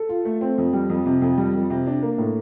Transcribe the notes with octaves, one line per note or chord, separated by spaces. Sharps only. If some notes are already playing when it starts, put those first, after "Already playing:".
Already playing: A4
F4
A3
C4
F2
G3
F2
C3
F2
G3
F2
C3
D4
A#3
A2